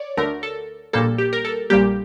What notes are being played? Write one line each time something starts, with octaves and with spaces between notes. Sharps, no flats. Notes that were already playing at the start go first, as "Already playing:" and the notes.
Already playing: C#5 D5
D2 D3 A3 A#4
A4
A#1 A#2 G3 A#3 A4
G4
A#4
A4
A#1 A#2 G3 A#3 G4